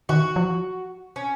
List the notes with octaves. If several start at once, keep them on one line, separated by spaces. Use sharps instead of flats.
D#3 F#4
F3
C#4